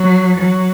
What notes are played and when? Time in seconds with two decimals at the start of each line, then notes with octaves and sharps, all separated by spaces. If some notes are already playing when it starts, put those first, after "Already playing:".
Already playing: F#3
0.37 F#3